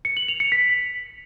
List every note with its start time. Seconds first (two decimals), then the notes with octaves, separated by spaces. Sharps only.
0.05 C#7
0.17 F#7
0.28 F7
0.40 C#7
0.52 B6